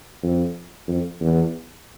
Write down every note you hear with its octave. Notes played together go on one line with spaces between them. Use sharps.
F2
F2
E2